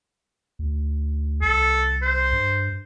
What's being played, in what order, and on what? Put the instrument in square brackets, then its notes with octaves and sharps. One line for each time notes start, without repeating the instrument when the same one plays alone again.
[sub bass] D2
[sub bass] C2 [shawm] A4
[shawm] C5
[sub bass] G2